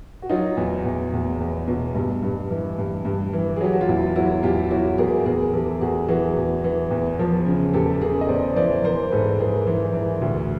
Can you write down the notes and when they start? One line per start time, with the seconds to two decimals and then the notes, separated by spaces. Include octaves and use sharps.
0.22 F#4
0.29 F#3 D#4 F4
0.57 E2
0.85 E2
1.13 E2
1.40 E2
1.68 B2
1.95 G2
2.23 G2
2.50 E3
2.78 G2
3.05 G2
3.33 E3
3.56 G#4
3.61 F#3 G4
3.73 F#4
3.81 F4
3.88 E2 E4
4.16 F#3 E4 F#4
4.43 E2 F4 G4
4.71 F#3 E4 F#4
4.98 E2 G#4 A#4
5.25 E2 G#4 A#4
5.53 E3 G4 A4
5.81 E2 F#4 G#4
6.08 E3 F#4 G#4
6.37 E2
6.64 E3
6.91 E2
7.19 F3
7.46 C#3
7.73 E2 G4 A4
8.01 C#3 G#4 A#4
8.21 D#5
8.29 E2 C5 D5
8.56 E3 C5 D5
8.84 E3 A#4 C5
9.11 G#2 A4 B4
9.39 E3 G#4 A#4
9.67 E3
9.94 E3
10.22 D2